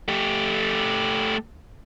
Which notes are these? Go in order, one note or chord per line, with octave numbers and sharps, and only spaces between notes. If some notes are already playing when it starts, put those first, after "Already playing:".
A3 G4